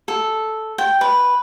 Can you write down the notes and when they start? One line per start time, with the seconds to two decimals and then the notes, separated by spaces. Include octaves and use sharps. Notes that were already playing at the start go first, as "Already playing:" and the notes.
0.08 A4
0.78 G5
1.01 B4